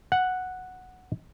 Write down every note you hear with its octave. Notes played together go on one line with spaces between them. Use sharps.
F#5